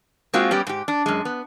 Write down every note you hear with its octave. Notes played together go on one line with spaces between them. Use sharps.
G#3 A#3 C4 F4 F#4
G3 B3 C#4 G4
G#2 G4
D4
F#2 G#3
B3